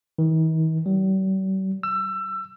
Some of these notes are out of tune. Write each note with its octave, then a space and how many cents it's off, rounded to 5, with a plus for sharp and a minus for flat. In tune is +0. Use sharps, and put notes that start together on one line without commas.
D#3 +45
G3 -45
E6 +25